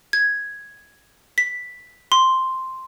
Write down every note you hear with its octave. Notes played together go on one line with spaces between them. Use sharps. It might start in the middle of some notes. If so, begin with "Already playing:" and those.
G#6
B6
C6